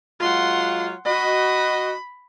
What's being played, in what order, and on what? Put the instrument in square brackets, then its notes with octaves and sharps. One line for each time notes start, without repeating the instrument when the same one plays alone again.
[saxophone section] F#3 G#3 F4 [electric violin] F#5 C6
[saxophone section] F#4 D#5 [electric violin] B5